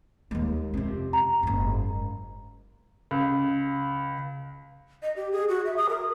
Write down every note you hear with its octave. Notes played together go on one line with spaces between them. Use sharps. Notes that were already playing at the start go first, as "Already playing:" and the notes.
D#2 G#3
F2 C3
A#5
F#1 G#2
C#2
D#5
G4
G#4
F#4
E5
D#6
A#4